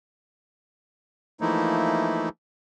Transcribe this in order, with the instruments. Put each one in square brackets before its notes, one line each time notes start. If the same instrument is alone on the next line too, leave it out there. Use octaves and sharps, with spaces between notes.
[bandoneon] E3 F3 A3 A#3 D#4 E4